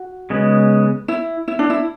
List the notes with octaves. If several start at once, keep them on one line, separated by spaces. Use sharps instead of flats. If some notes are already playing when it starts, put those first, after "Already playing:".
Already playing: F#4
C#3 G#3 B3
E4
E4
D4
E4